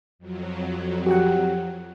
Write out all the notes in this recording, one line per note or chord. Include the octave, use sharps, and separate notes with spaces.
F2 F#3
F#4 G4 F#5